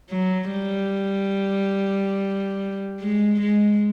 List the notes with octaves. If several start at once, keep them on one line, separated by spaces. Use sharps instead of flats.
F#3
G3
G#3
G#3